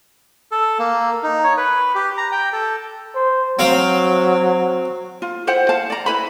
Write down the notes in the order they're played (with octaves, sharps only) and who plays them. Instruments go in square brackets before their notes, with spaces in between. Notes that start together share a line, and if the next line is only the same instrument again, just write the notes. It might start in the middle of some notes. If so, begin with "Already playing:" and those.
[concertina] A4
A#3
D#4
C#5
B4
G4
A#5
G5
A4
[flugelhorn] C5
[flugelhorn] F#3 [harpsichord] C4 F5 G5
[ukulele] F4
E4 C5 F#5 G5
F5 A5
D5 A#5
E4 B4 B5